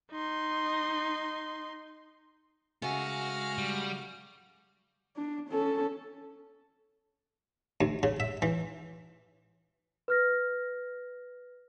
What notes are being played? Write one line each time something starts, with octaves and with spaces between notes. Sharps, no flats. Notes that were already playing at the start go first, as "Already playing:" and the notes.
D#4 C6
C#3 G#3 A3 F#4 G#5 F6
G3
D4
C#4 A4
D2
C#3
E5
E3
B4 F6 A#6